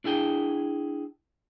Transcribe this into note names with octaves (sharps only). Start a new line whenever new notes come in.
D4 E4 G#4 G5